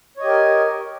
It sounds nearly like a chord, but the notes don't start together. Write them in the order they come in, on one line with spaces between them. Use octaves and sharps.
C#5 D#5 G4 A#4